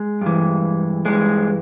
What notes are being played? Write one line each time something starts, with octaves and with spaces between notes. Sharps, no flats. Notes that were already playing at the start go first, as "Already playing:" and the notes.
Already playing: G#3
G2 E3
G2 E3 G#3